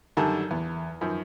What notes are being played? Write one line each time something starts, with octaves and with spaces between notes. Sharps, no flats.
F#2 D3 D#3 G3 A5 A#5
E2
F#2 D#3 F3